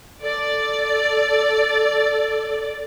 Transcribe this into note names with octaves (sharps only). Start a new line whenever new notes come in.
A4 D5